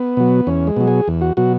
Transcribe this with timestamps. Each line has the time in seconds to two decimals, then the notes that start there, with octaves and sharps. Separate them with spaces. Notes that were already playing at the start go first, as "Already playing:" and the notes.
Already playing: B3
0.17 B2 F#3
0.47 E2 C#4
0.67 G#3
0.77 B2 F#3
0.87 G#4
1.08 E2
1.21 F#4
1.37 B2 F#3 F#4